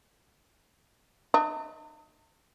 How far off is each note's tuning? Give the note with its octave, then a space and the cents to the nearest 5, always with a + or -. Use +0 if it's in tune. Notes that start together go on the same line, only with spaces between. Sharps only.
D#4 -45 D#5 +35